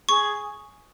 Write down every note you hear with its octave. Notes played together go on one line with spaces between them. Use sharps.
G#4 C#6